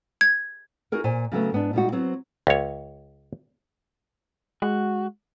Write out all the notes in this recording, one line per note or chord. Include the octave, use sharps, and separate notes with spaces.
G#6
D#4 F#4 G#4 A#4 B4
A#2 C5 G#5
C#3 F#3 A3 B3
G#2 B3 D4
A#2 G3 G#3 D4 D#4 F#4
F#3 B3 C4 C5
C#2 C#5
G#3 F#4